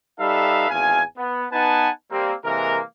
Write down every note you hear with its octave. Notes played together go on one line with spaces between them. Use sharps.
G3 D#4 A4 B4 E5 F5
G#1 E2 F5 G#5
B3
B3 D#4 B4 F#5 G#5 A5
G3 A#3 C4
C3 E3 G#3 A#3 A#4